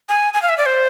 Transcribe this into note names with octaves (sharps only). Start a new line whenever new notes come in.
G#5
G#5
F5
E5
D5
C5